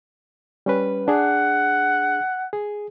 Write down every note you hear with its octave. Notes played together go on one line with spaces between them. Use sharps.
G3 C#4 B4
D4 G#4 F#5
G#4